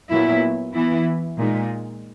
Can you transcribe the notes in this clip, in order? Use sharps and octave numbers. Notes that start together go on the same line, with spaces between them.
A#2 F#3 B3 E4
E3 B3 E4
A#2 G#3 D#4